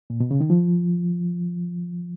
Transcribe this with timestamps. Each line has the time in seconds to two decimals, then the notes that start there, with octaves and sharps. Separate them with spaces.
0.10 A#2
0.20 B2
0.31 C#3
0.41 D#3
0.50 F3